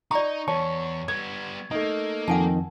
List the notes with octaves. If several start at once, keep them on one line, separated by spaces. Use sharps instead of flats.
D#4 D5 A#5 C#6
E2 C#5 A5 C#6
G3 B3 G#6
A3 A#3 D#4
F2 D#3 F#5 G#5 A5